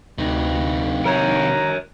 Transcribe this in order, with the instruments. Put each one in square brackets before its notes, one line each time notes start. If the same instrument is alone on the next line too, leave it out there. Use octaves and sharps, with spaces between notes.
[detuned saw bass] D2 [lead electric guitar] C3 D#4
[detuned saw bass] D#3 [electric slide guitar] A#4 C#5 [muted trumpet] A#5